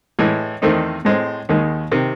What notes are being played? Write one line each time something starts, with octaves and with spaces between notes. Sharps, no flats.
A2 E3 G#3
E2 D#3 A3 C4 D#4
A2 G#3 C4
D#2 D#3 G#3
C3 D#3